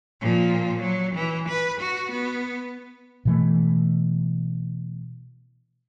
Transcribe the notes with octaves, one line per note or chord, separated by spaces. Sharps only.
A#2 F3
F#3
E3
B4
F#4
B3
B2 E3 A3